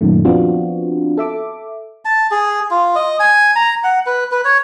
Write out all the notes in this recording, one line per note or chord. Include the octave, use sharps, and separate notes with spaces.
F#2 A#2 D#3 A3
F3 B3 C4 D4 F4 F#4
A4 E5 D6
A5
G#4
F4
D#5
G#5
A#5
F#5
B4
B4
C#5